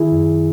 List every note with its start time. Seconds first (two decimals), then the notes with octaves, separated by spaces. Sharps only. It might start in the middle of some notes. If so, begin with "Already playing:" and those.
Already playing: D#3 E4 G#4
0.12 F#2